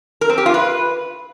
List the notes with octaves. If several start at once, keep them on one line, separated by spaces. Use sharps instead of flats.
A#4
C4
G4
F4
B4